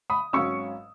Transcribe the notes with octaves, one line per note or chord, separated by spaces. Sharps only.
B5 D#6
G#1 G#2 F#3 C#4 C#6 E6